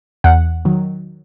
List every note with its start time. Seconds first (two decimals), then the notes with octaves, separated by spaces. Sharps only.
0.24 E2 F#5
0.65 D#3 F#3